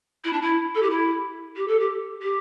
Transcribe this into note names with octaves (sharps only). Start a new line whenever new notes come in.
E4
D4
E4
A4
G4
E4
G4
A4
G4
G4